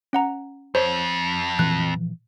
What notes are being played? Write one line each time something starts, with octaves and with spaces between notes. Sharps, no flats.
C#4 F#5 A#5
F2 C5 C#5
A#2 E3 F3 F#6